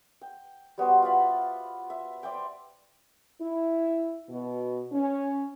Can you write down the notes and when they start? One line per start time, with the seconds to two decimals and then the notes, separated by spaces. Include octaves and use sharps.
0.21 G5
0.78 G3 B3 F#4 C5
1.02 F4 D5 E5 B5
1.90 E5
2.23 C5 D5 E5 G5
3.41 E4
4.30 B2
4.93 C#4